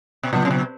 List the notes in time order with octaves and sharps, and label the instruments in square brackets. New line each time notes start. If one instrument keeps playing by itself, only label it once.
[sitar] B2
[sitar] A#2 [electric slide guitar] C#3 F#3 B3 D4 F4
[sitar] C3
B2